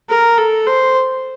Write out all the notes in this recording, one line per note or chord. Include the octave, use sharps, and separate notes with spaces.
A#4
A4
C5